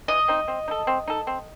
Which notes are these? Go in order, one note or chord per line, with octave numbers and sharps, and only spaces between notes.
E3 D#5
C4 D#4
C4
D#4
A4
C4
D#4 A4
C4